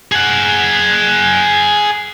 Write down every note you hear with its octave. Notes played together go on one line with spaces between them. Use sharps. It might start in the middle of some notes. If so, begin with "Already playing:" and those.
G#4 F#5